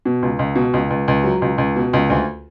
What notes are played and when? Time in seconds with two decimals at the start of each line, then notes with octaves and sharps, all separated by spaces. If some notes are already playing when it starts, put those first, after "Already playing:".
0.05 B2
0.23 C#2
0.39 C#2
0.56 B2
0.74 C#2
0.90 C#2
1.08 C#2
1.24 F#3
1.42 C#2
1.58 C#2
1.76 B2
1.93 C#2
2.10 D2